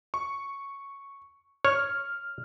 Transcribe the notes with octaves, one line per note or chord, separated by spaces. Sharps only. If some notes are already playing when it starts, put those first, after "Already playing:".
C#6
C#5 F6